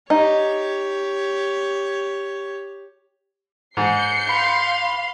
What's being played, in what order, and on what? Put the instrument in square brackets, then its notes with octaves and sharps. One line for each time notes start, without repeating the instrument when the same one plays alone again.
[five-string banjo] D#4 [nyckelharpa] G4 C#5
[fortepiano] G#2 [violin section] G6 C7 C#7
[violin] F5 C6 [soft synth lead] B5